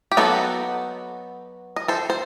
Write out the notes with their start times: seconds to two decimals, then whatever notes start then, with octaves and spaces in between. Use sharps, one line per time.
0.12 G4
0.17 F#3 B3 D#4 F#4 A4
1.76 D#5
1.88 A4 C5
2.10 C5